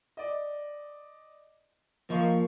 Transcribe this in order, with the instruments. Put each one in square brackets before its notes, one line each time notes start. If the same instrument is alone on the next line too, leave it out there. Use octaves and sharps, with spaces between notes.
[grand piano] D5 D#5
[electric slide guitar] F3 [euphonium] A#3 [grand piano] D#5 C#6